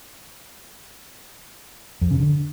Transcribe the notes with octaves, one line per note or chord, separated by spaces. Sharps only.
F2
C#3
D3